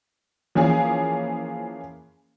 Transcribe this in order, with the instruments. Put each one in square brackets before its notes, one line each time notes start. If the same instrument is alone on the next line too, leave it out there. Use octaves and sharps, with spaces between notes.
[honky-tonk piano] E3 F3 A#3 C#4 G#4